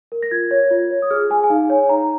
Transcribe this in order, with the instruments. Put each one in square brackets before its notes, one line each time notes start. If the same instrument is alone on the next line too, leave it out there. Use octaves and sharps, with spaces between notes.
[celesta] A#4
A#6
F4 G#6
C#5
F4
C#5
D#6
G#4 F6
G#4 G#5
G#5
D#4 F5
C#5 G#5
D#4 A#5